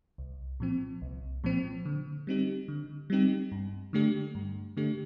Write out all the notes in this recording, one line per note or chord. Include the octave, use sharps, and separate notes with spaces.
C2
A#2 F3 C4
C2
A#2 F3 C4
D3
G3 C4 D#4 G4
D3
G3 C4 D#4 G4
G2
D3 A3 D4 G4
G2
D3 A3 D4 G4